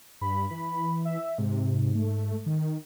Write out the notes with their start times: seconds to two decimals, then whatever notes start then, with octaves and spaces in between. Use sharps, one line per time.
0.21 G2 B5
0.51 E3
1.05 E5
1.38 G#2 C3
1.95 A3
2.46 D#3